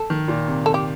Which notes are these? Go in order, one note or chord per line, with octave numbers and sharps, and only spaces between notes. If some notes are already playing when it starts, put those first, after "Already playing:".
Already playing: A4
D#3
A#2
C3
A4
G4